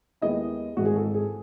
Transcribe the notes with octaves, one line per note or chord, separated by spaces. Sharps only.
D#2 D#3 G#3 B3 E4 D#5
G#1 G#2 E3 G#3 F#4
G#4
A4
G#4